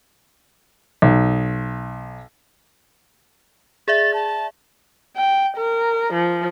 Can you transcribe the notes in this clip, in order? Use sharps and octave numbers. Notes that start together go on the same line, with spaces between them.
B1
G#4 D5 E5 A6
A5
G5
A#4
F3